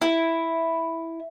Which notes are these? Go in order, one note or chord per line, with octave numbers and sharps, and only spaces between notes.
E4